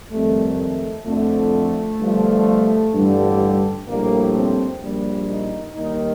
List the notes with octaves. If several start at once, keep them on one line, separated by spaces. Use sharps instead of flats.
F2 D#3 G3 A3
A3
F2 D3 F3 A3
G1 G2 F3
A1 G2 D3 G3
A#1 A2 G3 A#3
C4
A#1 A#2 G3
D#4
D#2 D#3 G3 D#4